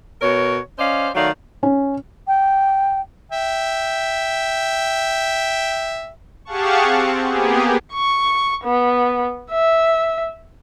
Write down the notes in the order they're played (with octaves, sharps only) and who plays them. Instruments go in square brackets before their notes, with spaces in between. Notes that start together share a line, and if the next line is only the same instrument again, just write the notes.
[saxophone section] B2 A#4 C#5
C#4 C5 D5 D#5 F5
D#3 F#3 A3 D5 F5
[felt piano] C#4
[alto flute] G5
[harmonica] E5 G5
[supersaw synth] G4 G#4 F5 F#5 A5 C#6
C4
A#3 B3 G4 G#4
[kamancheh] C#6
B3
E5